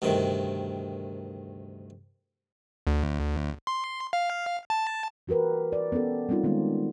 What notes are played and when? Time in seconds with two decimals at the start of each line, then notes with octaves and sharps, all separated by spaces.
0.02 D2 G2 C3 D#3
2.87 D2
3.67 C6
4.13 F5
4.70 A5
5.28 E3 F#4 G4 A#4 B4
5.72 D5
5.92 B3 C#4 G4 A4
6.29 G3 C4 C#4 D#4 F4
6.44 D#3 G#3 A#3 B3